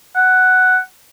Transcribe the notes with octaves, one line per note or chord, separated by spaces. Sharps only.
F#5